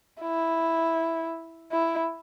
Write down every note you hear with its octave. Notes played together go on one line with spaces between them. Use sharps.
E4
E4